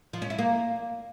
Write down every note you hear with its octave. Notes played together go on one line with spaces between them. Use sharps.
F3
C#4
E4
A#3